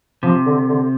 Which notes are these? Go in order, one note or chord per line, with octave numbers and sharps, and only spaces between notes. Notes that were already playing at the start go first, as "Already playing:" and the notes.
C3 F3
D3
D3